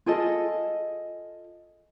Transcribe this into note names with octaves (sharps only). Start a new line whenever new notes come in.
F4 G#4 A4 D#5